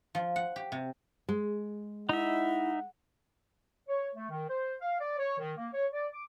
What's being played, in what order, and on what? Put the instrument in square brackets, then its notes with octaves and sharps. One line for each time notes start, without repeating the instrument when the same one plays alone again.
[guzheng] F3
F#5
G4
C3
[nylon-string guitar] G#3
[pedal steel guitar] D#4 E5 [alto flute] E4 [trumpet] F#5
[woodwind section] C#5
A3
D#3
C5
F5
D5
C#5
D#3
A#3
C#5
D5
D6